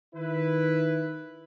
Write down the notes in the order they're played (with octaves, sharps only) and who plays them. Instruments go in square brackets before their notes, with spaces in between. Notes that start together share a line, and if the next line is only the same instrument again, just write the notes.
[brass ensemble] D#3 E4 B4